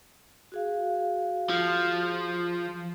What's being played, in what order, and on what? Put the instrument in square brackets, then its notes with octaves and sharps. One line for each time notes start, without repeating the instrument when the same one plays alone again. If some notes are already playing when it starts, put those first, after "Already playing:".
[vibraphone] F#4 G#4 F5
[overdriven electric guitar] F3